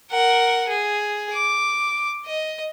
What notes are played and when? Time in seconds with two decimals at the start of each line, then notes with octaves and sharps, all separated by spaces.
0.11 A#4 F#5
0.69 G#4
1.34 D6
2.26 D#5